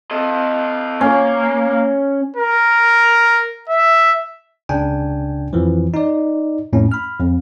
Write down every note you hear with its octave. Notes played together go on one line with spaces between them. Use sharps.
A4 D#5
A#3 C#4
A#4
E5
C#2 C#3 D4 G5 G#5
F2 E3 F3
D#4 D5
F2 A2 C#4
B5 F6
F2